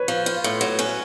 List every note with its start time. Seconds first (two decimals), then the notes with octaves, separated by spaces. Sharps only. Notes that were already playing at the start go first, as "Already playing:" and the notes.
Already playing: B4 C#5
0.08 F3
0.26 F4
0.44 A2
0.61 F#3
0.79 C#4